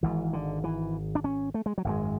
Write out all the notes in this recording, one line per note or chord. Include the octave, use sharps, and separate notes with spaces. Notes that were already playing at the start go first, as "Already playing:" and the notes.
G#1 G#2 E3
D3
E3
D4
C#4
A3
G#3
F#3
G#1 F#2 D3 G#3